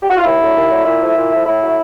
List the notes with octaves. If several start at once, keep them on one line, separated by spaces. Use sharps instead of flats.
G4
F#4
F4
D#2 E4
D3 F#3
D#2
D3 F#3
A#2 E4
F3 A3
A#2
F3 A3
A2 E4
F#3 A3